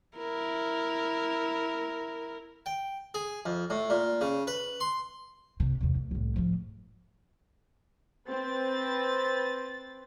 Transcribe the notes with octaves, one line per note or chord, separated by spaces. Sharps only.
E4 A#4
G5
G#4
F2
A2
A#2
C#3
B4
C6
C3
E2 G#2
D2
C2 A2
G#2 F3
C4 B4 A6